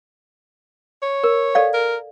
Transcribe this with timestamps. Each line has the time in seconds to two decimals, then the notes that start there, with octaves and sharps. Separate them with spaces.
1.03 C#5
1.24 A#4
1.55 A4 D5 F5
1.74 A#4